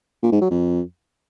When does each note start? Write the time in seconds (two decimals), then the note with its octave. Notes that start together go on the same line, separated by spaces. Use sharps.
0.22 A#2
0.32 G#2
0.41 F#3
0.51 F2